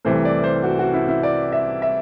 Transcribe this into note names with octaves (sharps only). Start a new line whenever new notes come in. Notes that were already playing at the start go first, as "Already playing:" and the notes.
C2 C3 E3 A3 C5
D5
C5
F#4
F#4
E4
E4
D5
E5
E5